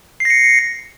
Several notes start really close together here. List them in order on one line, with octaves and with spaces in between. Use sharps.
C7 A#6 C#7